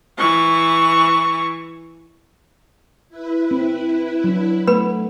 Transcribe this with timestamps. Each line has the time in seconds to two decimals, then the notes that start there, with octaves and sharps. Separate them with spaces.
0.18 E3 C#6
3.09 E4 B4
3.51 C4
4.24 F#3 D4
4.67 A3 B3 B4 B5